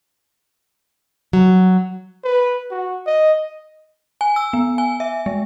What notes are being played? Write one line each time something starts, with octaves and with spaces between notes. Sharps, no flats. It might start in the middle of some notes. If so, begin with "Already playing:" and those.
F#3
B4
F#4
D#5
G#5
E6
B3
G#5
E5
G#3